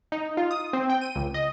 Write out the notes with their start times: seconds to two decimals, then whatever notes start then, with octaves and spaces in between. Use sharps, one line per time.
0.12 D#4
0.37 F4
0.51 D#6
0.73 C4
0.90 G5
1.01 D#7
1.15 C#2
1.34 D#5